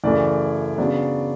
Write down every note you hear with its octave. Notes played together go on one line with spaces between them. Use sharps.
F#2 C#3 E3 A3 D5
C#3 F#3 B3 D4